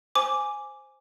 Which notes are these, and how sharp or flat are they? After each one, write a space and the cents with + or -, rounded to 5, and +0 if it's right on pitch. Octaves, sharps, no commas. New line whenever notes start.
C5 +0 G#5 +0 D6 -5